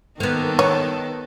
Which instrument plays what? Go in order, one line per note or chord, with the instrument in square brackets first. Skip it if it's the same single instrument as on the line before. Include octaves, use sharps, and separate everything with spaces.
[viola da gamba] D#3 A4 [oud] A#3 B3
[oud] B3 [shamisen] C#5